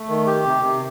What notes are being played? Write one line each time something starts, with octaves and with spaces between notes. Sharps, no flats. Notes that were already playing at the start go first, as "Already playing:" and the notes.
Already playing: A3
D#3
G4
C3
C3